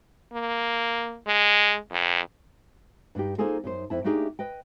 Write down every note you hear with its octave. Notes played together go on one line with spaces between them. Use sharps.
A#3
G#3
F2
G2 D4 D#4 G4
A#3 D#4 F4 G#4 A4 C5
F#2 D#4 C5
F2 E4 A5
A3 A#3 D4 D#4 G4 G#4
B4 D#5 G5